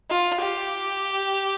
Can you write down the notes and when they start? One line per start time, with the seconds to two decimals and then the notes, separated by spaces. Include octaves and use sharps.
0.11 F4
0.41 G4